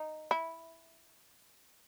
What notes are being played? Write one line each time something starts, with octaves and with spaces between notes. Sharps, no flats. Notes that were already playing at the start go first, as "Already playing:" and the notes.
Already playing: D#4
E4